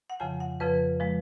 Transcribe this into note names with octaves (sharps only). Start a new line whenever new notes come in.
F#5
F2 C#3 F3 G#5
F#5
F2 C#3 F3 B4
F3 G#3